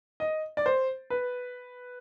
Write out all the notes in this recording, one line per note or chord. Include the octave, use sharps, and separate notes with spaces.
D#5
D5
C5
B4